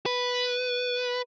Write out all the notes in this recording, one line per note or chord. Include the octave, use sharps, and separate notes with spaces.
B4